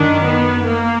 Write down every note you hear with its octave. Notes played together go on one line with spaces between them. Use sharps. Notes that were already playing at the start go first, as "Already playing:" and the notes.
Already playing: F#2 D#3 D4
B3
A#3